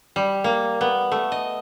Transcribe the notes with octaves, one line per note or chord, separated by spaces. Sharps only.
G3
A#3
B3
A3
D#5